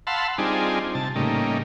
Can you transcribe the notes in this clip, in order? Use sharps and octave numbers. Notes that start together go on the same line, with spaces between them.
F5 F#5 A5 B5 C6 E6
G3 C4 D4 D#4 F4 G#4
C3 A5
A2 C#3 G3 A#3 D#4